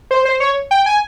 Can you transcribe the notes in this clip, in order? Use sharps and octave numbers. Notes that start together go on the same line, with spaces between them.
C5
C5
C#5
G5
G#5